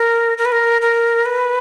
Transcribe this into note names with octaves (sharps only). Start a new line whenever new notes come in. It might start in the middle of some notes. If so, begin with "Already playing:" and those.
Already playing: A#4
A#4
B4
A#4
A#4
B4